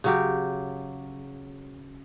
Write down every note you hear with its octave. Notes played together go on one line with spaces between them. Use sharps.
C#3 F#3 G4